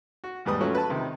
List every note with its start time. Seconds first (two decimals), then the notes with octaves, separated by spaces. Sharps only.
0.24 F#4
0.45 D#2 G#2 G3 B4 D#6
0.60 F3 F#3 A3 C#4 F#4
0.75 B4 A5
0.90 C3 D#3